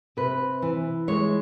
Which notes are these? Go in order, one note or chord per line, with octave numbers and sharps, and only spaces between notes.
C3 B4
E3
G#3 C#5